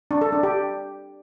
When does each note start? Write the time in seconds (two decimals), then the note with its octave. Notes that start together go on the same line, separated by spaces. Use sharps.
0.11 D4
0.22 A4
0.32 D4
0.43 G4